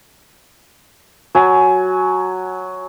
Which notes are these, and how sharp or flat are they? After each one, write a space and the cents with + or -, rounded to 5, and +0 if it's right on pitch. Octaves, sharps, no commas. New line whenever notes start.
F#3 +0 G#5 +20